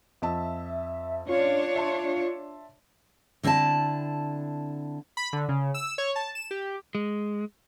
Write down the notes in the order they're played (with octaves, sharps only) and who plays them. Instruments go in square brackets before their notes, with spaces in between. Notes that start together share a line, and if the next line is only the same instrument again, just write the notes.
[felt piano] F2 D#5 A5 [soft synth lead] E5
[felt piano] C#4 [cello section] D4 C#5 [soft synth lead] F4
[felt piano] E5 A5 C6
[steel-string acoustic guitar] D3 C4 E4 D5 A5
[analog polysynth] B5
D3
C#3
E6
C#5
A5
E7
G4
[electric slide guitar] G#3